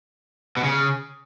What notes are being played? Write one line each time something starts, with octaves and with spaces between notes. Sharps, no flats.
B2
C#3